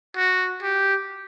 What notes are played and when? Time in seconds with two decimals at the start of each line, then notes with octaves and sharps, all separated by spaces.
0.16 F#4
0.62 G4